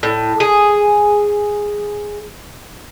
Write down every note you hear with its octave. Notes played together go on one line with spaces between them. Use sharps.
A2
G#4